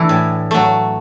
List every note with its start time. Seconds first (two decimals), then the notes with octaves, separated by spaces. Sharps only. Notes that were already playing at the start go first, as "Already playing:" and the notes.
Already playing: E3 A3 D4 E4
0.09 A2
0.51 F#3 A3